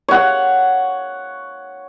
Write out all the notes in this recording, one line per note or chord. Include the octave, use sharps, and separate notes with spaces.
C#5 F5 F#5